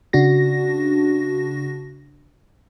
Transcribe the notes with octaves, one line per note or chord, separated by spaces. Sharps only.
C#3 D4 F#4 A#6